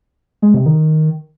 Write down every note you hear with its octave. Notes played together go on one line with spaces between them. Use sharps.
G#3
C3
D#3